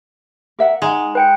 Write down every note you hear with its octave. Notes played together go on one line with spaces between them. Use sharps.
A#4 E5 F#5
G#3 D#4 F#5
B4 G5 C#7